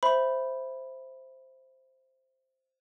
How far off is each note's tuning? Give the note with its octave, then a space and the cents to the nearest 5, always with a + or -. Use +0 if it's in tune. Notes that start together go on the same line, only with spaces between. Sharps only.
C5 +0 E5 +0 B5 +0